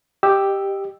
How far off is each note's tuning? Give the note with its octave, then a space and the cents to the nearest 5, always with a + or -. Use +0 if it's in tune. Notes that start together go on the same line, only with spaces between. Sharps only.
G4 +0 D#5 -20 E6 +0